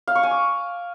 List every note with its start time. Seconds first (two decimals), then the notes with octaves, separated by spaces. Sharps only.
0.07 F5
0.15 C#6
0.23 G#5
0.31 D6